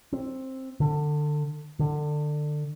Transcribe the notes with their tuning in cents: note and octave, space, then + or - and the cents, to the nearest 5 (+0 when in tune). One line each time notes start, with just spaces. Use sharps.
C4 +10
D3 +20
D3 +25